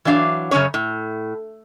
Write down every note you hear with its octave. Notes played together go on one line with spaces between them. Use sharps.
E3 F#3 D4 F5
F#2 C#3 G#3 C#4 C#5
A2